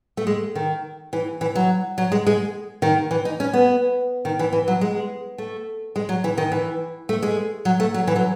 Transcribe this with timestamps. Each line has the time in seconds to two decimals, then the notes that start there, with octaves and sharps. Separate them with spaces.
0.17 A3
0.27 G#3
0.55 D#3
1.13 E3
1.41 E3
1.55 F#3
1.98 F#3
2.12 G#3
2.27 G#3
2.82 D#3
3.11 E3
3.25 D#4
3.40 C#4
3.53 B3
4.25 D#3
4.39 E3
4.53 E3
4.68 F#3
4.81 G#3
5.38 A3
5.96 G#3
6.09 F#3
6.24 E3
6.38 D#3
6.52 E3
7.09 A3
7.22 G#3
7.65 F#3
7.80 A3
7.94 F#3
8.07 E3
8.16 F#3